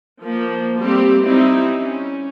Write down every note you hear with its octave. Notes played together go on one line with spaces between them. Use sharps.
F3 A#3
G3 A3 A#3 C4 G4
G3 C4 D#4 E4
C#4